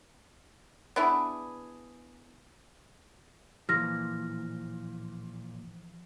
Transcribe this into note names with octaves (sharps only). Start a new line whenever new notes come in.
B3 D4 E4 G#4
A#2 E3 F3 F6 A#6